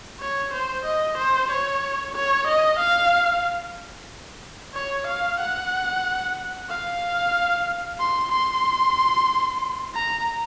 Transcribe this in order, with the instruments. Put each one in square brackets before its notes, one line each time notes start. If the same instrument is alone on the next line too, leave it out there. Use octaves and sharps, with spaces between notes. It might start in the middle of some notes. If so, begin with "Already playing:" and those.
[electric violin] C#5
C5
D#5
C5
C#5
C#5
D#5
F5
C#5
F5
F#5
F5
C6
C6
A#5